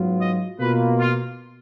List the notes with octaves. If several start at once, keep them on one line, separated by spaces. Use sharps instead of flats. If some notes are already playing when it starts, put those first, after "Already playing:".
Already playing: G#2 F#3 B3 F4
D#5
B2 A#3 F4 B4
F4